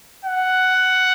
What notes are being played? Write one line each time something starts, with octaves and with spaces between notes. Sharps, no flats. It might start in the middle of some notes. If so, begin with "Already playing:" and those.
F#5